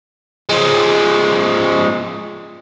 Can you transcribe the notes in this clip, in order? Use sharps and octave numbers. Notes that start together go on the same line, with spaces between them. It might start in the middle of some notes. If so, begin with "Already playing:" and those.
F3 G#3